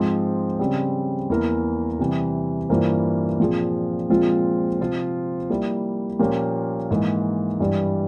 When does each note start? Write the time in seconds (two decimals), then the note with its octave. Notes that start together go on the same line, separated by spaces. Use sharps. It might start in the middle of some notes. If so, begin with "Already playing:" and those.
Already playing: G#2 F3 G#3 C4
0.59 C#3 G3 C4
1.30 E2 E3 A#3 E4 A#4
1.99 C3 E3 G3
2.69 G2 E3 A#3 F4 C5
3.40 A#2 F3 C4 F4 G#4
4.10 A#2 F3 G#3 C4 F4
4.80 C3 F3 C4 F4
5.50 G3 A#3 E4
6.19 A#2 F3 A#3 C#4 G4
6.91 G#2 E3 A#3
7.60 G2 E3 G3